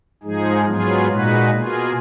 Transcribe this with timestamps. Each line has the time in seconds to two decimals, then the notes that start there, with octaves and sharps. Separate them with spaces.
0.23 G#2 F3 G#3 D#4 G#4
0.65 G#2 F#3 B3 F4 G#4
1.08 A#2 G#3 D#4 F#4 B4
1.50 B2 A#3 F4 G#4